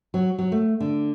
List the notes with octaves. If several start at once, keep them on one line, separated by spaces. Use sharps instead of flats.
F#3
F#3
A3
D3